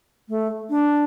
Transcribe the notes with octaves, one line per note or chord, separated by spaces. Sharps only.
A3
D4